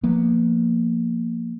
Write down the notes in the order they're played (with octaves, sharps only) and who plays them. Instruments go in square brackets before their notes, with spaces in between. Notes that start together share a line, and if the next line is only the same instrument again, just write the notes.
[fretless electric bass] F3 A#3 B3